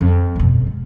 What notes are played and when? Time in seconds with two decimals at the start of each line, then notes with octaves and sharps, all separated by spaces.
0.01 F2
0.36 G1 B2
0.67 G#3